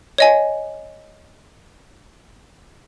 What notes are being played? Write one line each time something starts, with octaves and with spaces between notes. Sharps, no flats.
C#5 D#5 G#5